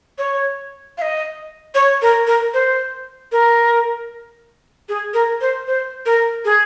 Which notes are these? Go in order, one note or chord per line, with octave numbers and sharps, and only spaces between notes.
C#5
F5
D#5
C#5
A#4
A#4
C5
A#4
G#4
A#4
C5
C5
A#4
G#4